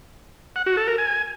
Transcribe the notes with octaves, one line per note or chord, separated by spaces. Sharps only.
F#5
F#4
A4
A#4
G#5